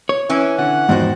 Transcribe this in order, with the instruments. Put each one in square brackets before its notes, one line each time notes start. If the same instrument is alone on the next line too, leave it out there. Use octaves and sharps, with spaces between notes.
[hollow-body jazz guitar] C#5
[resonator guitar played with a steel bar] E3 C#4
[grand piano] D3 [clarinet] F#5
[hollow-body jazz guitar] E2 G#2 [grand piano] D#3 F3 F#4